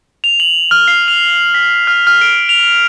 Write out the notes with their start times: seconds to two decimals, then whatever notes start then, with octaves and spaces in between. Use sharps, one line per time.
0.24 F7
0.40 F#7
0.71 F6
0.88 C7
1.08 F7
1.54 B6
1.87 F6
2.07 F6
2.21 D7
2.49 F7